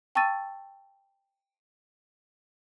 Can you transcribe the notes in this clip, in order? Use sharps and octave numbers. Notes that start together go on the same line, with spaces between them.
G5 A5 C#6 E6 A6 D#7